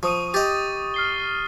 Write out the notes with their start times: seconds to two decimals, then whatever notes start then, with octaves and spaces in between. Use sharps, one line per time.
0.03 F3 C#6 D#6 D#7
0.34 G4 D#5 A6
0.94 F6 C7 G7